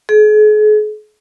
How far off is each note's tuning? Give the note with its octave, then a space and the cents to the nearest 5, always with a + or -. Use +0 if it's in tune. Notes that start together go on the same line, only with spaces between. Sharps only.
G#4 +40